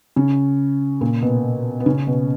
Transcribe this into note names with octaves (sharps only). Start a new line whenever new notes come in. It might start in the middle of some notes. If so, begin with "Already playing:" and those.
C#3 C#4
A#2 A#3
B2 B3
B3
C#3 C#4
B2 B3